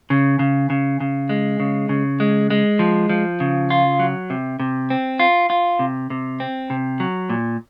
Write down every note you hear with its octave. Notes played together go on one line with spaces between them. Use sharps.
C#3
C#3
C#3
C#3
G#3
C#3
C#3
G#3
G#3
F3
F3
C#3
F4
F#3
C3
C3
C4
F4
F4
C3
C3
C4
C3
F#3
A#2